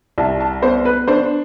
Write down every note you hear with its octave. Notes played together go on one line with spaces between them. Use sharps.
C2 A5
A5
B3 C5
B4
D4 C5